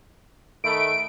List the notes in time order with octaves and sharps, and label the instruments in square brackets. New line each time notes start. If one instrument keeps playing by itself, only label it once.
[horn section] D#3 A3 B5 [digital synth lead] D7